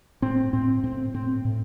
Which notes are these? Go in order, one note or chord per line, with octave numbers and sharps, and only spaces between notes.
A2 C4
A2 C4
A2 C4
A2 C4
A2